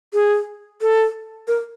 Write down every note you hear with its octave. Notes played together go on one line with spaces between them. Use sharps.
G#4
A4
A#4